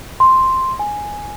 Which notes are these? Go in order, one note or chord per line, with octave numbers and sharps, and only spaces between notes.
C6
G#5